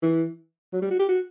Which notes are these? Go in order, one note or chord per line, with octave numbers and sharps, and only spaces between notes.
E3
F#3
G3
F#4
G4
F#4